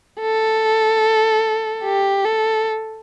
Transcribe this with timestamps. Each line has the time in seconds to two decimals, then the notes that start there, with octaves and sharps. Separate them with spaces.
0.21 A4
1.84 G4
2.25 A4